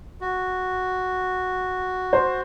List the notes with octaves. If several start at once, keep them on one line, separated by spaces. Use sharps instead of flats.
F#4
C5